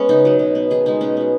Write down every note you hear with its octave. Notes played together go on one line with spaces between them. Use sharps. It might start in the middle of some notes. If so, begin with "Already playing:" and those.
Already playing: G#3 B3 C#4 C#5
C#3 D#4
F#3 B3
B2
B3
D#3 G#4
G#3 B3 D#4
B2 C#4
F#3 B3